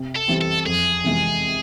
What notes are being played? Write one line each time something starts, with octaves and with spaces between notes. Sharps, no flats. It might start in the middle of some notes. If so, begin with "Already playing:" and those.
Already playing: C3
A4
E3 G3 C4
A4
F2 G#4
C3 E3 G#3